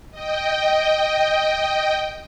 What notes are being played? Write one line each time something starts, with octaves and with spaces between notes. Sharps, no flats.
D#5 G5